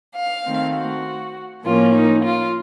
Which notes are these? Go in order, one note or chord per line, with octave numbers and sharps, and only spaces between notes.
F5
D#3 A3 C4
F#4
A2 F3 A#3 C#4 F4
D#4
F4